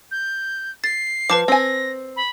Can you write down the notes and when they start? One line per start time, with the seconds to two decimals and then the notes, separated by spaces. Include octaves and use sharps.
0.11 G6
0.84 A6 C7
1.30 F3 B4 A5 D6
1.48 C4 G#5 A#6
2.16 B5